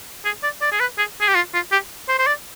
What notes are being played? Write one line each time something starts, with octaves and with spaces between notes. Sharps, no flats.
G#4
D5
D5
G#4
B4
G#4
G#4
G4
F4
F4
G4
C5
C5
D5